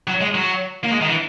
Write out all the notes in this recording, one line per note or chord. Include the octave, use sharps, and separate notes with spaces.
F#3
G#3
F#3
A#3
G#3
D#3
E3